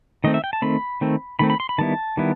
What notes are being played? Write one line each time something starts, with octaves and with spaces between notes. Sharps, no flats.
D#3 A3 C4 D#5
E5
G5
A5
D#3 A3 C4 B5
D#3 A3 C4
D#3 A3 C4 B5
B5
C6
B5
D#3 G3 B3 E4 A5
D#3 G3 B3 E4